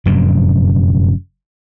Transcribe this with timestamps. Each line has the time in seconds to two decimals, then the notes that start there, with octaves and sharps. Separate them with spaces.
0.06 F1 F#2 A#2 D3